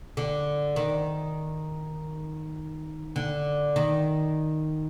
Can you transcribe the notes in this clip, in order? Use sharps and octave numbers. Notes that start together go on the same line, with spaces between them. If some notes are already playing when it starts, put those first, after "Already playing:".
D3
D#3
D3
D#3